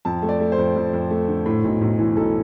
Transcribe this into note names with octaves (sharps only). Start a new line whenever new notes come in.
F2 A5
A3
D5
A3
C5
F2
F2
F2
A3
D3
A2
B1
B1
E3
B1 A4